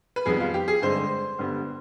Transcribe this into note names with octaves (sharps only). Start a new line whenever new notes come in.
B4
F2 D#3 G3 B3 G#4
F4
G4
G#4
G2 D3 G#3 C4 C5
G2 D3 G3 B3